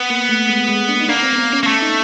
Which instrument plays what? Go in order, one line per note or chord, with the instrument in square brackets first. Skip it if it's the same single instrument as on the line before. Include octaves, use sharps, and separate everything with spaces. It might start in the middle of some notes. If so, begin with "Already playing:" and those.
Already playing: [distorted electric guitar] B3
[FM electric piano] A#3
A3
G#3
G#3
D4
D#4
[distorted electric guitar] A#3 [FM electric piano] D4
[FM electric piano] C4
B3
C4
C#4
[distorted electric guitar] A#3
A3
[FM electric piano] D#4